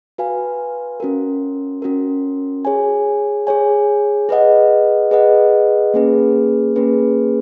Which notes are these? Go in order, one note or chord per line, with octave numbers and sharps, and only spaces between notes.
F#4 B4 F5 G#5
C#4 F#4 A#4
C#4 F#4 A#4
G#4 C#5 G#5
G#4 C#5 G#5
G#4 B4 D#5 F#5
G#4 B4 D#5 F#5
A#3 C#4 G#4 B4
A#3 C#4 G#4 B4